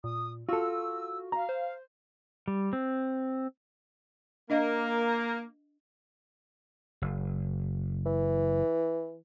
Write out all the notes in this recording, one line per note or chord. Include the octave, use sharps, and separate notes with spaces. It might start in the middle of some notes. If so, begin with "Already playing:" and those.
A#2 D#6
F4 F#4 A4 E6
F5 A#5
C5
G3
C4
A#3 D4 D#5 F5
F#1
E3